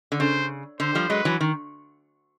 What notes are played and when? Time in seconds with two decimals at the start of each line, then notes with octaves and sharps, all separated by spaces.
0.12 D3
0.19 C#3 C5
0.80 D3 C5
0.95 F3 G3
1.10 F#3 G#3 B4
1.25 E3 F#3
1.41 D#3